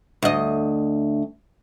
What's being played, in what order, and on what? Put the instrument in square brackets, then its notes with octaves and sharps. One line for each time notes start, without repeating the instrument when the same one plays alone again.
[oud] D2 D#5